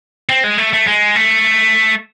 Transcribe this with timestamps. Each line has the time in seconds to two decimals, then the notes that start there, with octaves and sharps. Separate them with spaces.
0.29 C4
0.44 G#3
0.58 A3
0.73 A3
0.87 G#3
1.16 A3